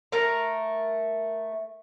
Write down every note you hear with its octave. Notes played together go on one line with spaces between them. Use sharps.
A3 A#4 A#5